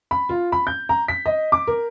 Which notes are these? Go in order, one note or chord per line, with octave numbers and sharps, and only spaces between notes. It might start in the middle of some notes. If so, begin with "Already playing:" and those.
B5
F4
B5
G6
A#5
B6
D#5
D6
A#4